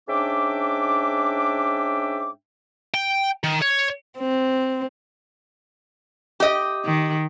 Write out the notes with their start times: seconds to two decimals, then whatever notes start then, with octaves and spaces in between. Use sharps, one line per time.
0.08 G#2 C#4 D4 E5 G5 D6
2.94 G5
3.44 D#3
3.62 C#5
4.19 C4
6.40 G4 D#5
6.85 D#3